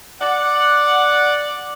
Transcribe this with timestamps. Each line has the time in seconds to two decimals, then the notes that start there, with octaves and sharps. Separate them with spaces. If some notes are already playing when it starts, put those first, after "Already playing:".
0.21 D5 F#5